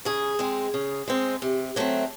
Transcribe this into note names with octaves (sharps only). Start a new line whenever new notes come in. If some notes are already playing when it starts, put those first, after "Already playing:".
C#3 G#4
G#3 C4
C#3
G#3 C4
C3
F#3 A3 C4